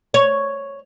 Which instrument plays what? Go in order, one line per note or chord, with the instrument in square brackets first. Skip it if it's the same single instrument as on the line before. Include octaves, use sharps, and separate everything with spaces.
[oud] C#5